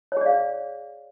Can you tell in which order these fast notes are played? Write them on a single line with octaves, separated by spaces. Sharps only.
C#5 G#4 D5 F5